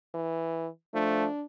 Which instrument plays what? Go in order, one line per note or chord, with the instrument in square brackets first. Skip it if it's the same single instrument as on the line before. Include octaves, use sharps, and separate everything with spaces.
[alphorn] E3
[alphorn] F3 [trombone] A3 [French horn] D4